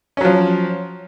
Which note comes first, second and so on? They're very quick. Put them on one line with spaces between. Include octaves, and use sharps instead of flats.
C#4 F#3 F3